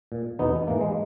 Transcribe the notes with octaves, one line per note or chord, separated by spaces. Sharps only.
A#2
E2 B2 B3 D#4
G#2 E3 A#3
G#3